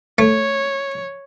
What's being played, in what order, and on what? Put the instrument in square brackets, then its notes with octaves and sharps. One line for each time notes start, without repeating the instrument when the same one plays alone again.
[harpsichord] A3 [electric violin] C#5